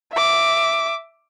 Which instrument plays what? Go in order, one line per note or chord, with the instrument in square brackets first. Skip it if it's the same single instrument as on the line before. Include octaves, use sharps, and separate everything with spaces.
[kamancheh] E5 D6